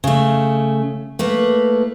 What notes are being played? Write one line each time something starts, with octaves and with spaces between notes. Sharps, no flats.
C#3 A3
A3 A#3 E4 B4